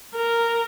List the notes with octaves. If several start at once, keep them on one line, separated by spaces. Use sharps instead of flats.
A#4